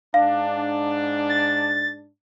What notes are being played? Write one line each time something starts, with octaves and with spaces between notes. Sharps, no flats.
G#2 D4 F5
A6